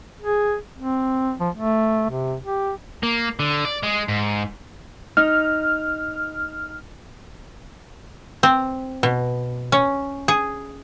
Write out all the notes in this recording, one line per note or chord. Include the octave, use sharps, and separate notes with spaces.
G#4
C4
F3
A3
C3
G4
A#3
D3
D5
G#3
G#2
D#4 F6
C4
B2
C#4
G#4